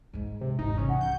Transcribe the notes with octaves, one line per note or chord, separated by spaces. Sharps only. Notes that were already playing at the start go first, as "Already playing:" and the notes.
G#2 G#3
C3
G#1 E2 D#4
C3 E3 C#4
F#5
B1 G6